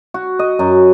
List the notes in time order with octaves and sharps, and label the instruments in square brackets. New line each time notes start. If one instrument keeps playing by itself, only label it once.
[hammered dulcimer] F#4
D#5
F#2